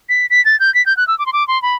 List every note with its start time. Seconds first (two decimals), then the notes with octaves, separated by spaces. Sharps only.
0.09 B6
0.30 B6
0.45 A6
0.60 G6
0.74 B6
0.86 G6
0.97 F#6
1.08 E6
1.19 D6
1.26 C6
1.33 D6
1.48 C6
1.62 B5